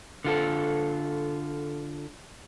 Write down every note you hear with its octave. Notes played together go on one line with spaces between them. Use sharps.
D3 F4 A4